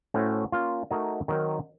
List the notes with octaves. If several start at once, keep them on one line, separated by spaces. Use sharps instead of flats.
A2 A3 C#4 F#4 C5
A#3 C#4 F4
A3 D#4 F#4 A#4 D#5
D#3 F#3 C4 D#4 A#4